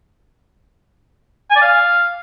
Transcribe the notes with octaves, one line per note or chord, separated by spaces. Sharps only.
G#5
D5
F5